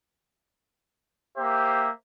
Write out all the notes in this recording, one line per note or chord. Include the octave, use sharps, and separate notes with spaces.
A#3 G4 C5 E5